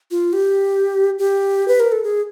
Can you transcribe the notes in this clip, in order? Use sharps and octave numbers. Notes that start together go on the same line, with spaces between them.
F4
G4
G4
B4
A#4
A4
G#4